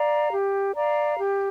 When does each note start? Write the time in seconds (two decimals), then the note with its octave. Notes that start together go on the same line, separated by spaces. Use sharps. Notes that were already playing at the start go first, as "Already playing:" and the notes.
Already playing: D5 F5 A#5
0.33 G4
0.75 D5 F5 A#5
1.18 G4